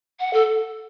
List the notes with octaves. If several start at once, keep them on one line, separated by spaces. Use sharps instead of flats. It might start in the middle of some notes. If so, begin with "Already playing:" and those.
F#5
A4